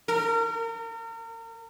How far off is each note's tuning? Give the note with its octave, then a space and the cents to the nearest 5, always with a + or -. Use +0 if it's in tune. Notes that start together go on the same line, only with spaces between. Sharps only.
A#4 -35